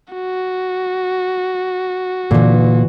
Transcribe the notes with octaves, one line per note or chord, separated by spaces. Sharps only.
F#4
A#2 D3 E3